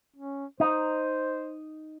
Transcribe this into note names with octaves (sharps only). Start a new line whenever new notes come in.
C#4
D#4 C5